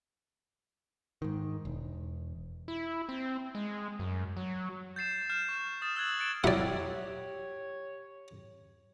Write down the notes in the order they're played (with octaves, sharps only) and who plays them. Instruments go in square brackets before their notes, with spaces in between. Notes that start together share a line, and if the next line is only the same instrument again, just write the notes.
[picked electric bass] G#2 D#3
E1
[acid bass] E4
C4
G#3
F#2
F#3
[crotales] G6 A6 C7 E7
F6 G6 C7 E7
C#6
D#6 F6 A6 E7
E6 F#6 G#6 F#7
F#6 A6 C#7 D7 E7
[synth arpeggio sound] F#3 E4 [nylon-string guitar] G4 [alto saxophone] C#5 [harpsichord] D5 F#5